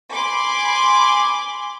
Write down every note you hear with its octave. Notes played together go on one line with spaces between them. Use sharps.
G#5 B5 C6 D6